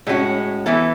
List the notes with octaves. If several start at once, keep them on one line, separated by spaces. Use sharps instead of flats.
A2 G#3 C#4 F#4
E3 B3 E4 A4